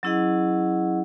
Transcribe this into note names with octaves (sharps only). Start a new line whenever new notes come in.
F#3 C#4 E4 G#4 D#5 F#5